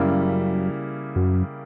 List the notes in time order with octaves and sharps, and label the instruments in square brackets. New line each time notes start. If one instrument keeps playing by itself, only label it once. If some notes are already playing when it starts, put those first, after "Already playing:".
Already playing: [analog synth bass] F#2 [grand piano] C#3 G3 A#3 E4
[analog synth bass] F#2